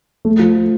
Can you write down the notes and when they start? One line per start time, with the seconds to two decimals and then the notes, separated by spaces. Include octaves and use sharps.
0.25 A3
0.39 F3